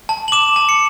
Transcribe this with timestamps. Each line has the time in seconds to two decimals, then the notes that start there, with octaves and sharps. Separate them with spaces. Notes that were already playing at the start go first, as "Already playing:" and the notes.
0.09 A5
0.28 F#7
0.32 D6 E7
0.56 A5
0.69 C#7